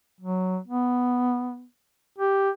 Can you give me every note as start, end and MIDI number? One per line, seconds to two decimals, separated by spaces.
0.21 0.58 54
0.68 1.65 59
2.18 2.50 67